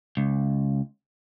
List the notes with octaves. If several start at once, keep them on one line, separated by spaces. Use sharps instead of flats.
C#2